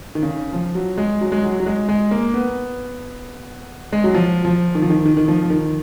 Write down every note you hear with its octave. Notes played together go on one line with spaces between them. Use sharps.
D#3
C#3
F3
F#3
G#3
F#3
G#3
F#3
F#3
G#3
G#3
A#3
B3
G#3
F#3
F3
F3
D#3
F3
D#3
D#3
D#3
F3
F3
D#3